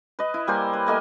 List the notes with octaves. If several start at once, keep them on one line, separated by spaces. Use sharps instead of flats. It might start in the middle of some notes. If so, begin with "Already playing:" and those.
B4 D#5
E4
G3 A#3 C5 G#5
B4
A3 A#3 D#5 G#5